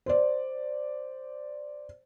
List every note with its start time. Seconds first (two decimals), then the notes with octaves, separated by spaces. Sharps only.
0.06 C5 D5